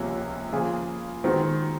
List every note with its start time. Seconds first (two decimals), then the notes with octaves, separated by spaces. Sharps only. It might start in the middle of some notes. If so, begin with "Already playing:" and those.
Already playing: C#2 C3 F3 A#3 C#4
0.52 C#3 F3 A#3 F4 G#4
1.24 D#3 G#3 C4 F#4